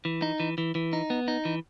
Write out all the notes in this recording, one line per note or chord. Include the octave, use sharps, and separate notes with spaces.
E3
D#4
E3
E3
E3
D#4
B3
D#4
E3